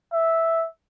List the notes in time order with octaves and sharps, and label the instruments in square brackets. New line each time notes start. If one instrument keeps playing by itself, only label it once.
[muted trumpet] E5